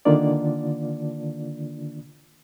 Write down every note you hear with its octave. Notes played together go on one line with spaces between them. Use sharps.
D3 D#3 A#3 D4 F4 D5